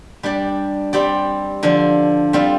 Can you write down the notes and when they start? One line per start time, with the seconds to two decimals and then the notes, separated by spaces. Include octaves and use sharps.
0.23 G3 D4 G4 D5
0.93 G3 C4 G4 D5
1.63 D3 F3 D4
2.33 G3 C4 F4